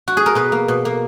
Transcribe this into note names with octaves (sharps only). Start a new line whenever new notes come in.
F#4
G#4
A#4
B2 B4
A#3
B2
A#3